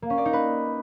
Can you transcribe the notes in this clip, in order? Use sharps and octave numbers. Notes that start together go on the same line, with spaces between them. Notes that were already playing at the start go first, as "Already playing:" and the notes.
A#3
C#4
D5
D#4
B4